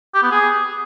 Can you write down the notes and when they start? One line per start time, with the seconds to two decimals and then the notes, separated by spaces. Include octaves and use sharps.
0.14 G4
0.23 B3
0.31 G#4